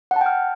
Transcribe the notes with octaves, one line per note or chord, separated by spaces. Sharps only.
F#5
A5
G5
F6